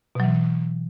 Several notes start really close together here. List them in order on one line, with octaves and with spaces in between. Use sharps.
B2 F#3 E3